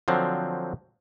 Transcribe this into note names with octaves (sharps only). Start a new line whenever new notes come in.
D3 F3 F#3 C4